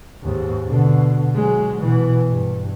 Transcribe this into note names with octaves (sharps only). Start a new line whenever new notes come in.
D#2 G#2
B2 D3
F#3 G#3
B2 E3
G2